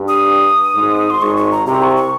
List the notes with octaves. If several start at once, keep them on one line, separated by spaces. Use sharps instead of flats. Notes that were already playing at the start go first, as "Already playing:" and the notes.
Already playing: G2
D#6
G#1 G#2
C6
G#1 G#2 C#6
C#6
A#5
C2 C3 A#5
C#6
C#6